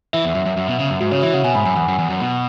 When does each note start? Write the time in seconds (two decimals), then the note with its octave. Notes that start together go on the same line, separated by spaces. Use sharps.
0.13 E3 E5
0.25 E2
0.35 F#2
0.46 F#2
0.57 F#2
0.68 B2
0.79 C#3
0.90 F#2
1.00 G#2 F#4
1.11 C#3 C#5
1.22 E3 E5
1.33 C#3 F#5
1.44 B2 G#5
1.55 G#2 B5
1.66 F#2 G#5
1.76 E2 F#5
1.88 F#2
1.99 E2
2.10 F#2
2.21 B2